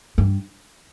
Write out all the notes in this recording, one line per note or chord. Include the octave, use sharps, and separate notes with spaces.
G2